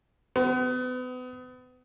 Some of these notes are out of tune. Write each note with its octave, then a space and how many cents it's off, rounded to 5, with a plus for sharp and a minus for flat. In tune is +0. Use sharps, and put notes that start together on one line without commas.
B3 +35